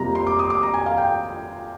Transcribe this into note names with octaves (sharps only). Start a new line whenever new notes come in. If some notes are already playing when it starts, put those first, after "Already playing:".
Already playing: F2 C3 G3 A#3 A#5
C6
D6
D#6
D6
A#5
G#5
F5
G5